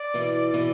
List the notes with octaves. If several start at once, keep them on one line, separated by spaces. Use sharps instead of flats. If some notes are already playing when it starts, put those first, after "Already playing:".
Already playing: D5
B2 E3
B2 E3